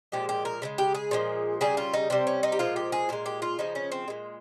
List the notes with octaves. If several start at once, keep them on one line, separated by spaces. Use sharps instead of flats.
A#2 F3 G#3 G4
G4
A#4
C#3 F3 G#3
G4
G#4
A#2 F3 G#3
C#3 G3 G#4
F4
D#4
C3 G3 C4
C#4
D#4
G4
A#2 F3 G#3 F4
G4
G#4
A#2 G#3 A#4
G4
F4
C#3 F3 G#3 D#4
C#4
C4
A#2 G#3